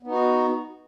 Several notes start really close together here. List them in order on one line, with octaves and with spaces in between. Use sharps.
B3 D#4 F#4